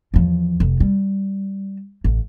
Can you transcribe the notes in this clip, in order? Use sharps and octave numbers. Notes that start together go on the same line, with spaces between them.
E2 F3
F1
G3
A1